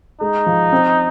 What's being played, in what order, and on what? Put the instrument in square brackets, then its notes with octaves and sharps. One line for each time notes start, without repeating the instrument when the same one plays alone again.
[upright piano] G#3 [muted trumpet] D#4
[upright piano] F3
C4